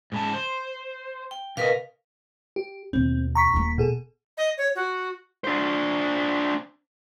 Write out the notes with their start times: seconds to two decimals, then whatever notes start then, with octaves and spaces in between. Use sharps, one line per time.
0.12 G#2 C#3 A5
0.34 C5
1.31 G5
1.57 C3 A#4 B4 D#5 F5
2.56 G4
2.93 D#2 B2 C4
3.35 A#5 C#6 B6
3.54 D#1 A#3
3.78 B2 G#4 A4
4.37 D#5
4.58 C#5
4.75 F#4
5.44 D4 C5